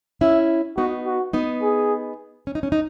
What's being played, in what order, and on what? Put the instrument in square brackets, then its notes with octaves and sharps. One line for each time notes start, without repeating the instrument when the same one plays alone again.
[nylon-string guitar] C#4 E4 [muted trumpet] E5
[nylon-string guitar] B3 D#4 [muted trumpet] F#4
[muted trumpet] F#4
[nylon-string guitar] B3 D#4
[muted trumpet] G#4
[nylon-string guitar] C#4
D#4
C#4
D#4